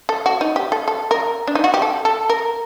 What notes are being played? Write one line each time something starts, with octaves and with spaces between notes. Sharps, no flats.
A4
F#4
D#4
G4
A4
A4
A#4
D4
D#4
F#4
G4
A4
A4
A#4